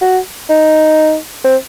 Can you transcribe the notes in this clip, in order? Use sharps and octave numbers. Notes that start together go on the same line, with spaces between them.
F#4
D#4
C4